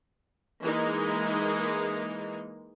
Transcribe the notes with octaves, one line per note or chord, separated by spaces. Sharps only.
E3 G#3 A#3 D#4